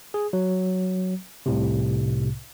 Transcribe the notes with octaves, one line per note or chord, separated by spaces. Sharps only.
G#4
F#3
C2 A2 C3